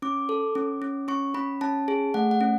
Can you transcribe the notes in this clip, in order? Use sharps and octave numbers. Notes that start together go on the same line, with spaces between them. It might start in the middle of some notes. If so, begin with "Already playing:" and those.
C#4 D6
A4
C#4
C#4
C#4 C#6
C#4 B5
C#4 A5
G#4
A3 F#5
F#5
C#4